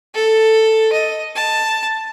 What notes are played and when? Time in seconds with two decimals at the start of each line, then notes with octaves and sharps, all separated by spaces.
0.14 A4
0.93 D#5
1.36 A5